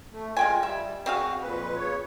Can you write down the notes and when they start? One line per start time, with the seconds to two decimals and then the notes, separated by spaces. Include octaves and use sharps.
0.12 A3
0.37 G#3 F4 G5 G#5
0.63 G3 E5
1.06 C4 F#4 G#4 F5
1.41 F2 A#2 B4
1.77 C#3 C#5